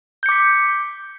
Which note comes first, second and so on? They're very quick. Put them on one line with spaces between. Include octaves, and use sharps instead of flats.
G6 C#7 D6 B6